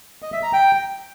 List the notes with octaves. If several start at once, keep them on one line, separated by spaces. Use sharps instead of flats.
D#5
E5
A#5
G5